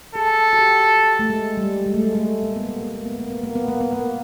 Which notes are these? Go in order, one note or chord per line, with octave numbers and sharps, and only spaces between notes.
G#4 A4
F#4
G4
A3
G#3
G3
G#3
A3
G#3
A3
A#3
B3
A#3
B3
A#3
B3
A#3
B3
A#3
B3
A#3
B3
A#3